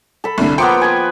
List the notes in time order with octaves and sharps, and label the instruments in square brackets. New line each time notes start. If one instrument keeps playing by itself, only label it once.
[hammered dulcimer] A4 B5
[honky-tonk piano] C2 D3
[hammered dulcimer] F3 A#3 B3 [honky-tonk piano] G5 C6 C#7
[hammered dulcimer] B4 G#5